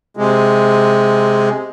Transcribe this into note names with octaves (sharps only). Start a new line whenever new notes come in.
C3 G#3